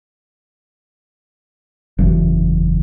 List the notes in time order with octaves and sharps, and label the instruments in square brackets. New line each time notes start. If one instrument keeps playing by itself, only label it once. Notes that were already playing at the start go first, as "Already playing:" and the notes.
[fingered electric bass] F#1 E2